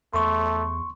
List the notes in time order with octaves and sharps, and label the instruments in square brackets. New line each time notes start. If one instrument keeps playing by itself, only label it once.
[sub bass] E2 [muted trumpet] A3 [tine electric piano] C6 C#6